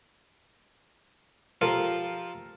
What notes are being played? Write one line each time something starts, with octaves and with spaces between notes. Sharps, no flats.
F3 F4 G4 A4 A#4